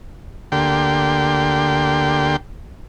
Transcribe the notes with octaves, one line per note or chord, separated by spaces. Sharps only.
D2 D3 A#3 G4 G5 C6